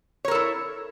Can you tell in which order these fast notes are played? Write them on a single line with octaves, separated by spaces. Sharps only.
C#5 A#4 A4 E4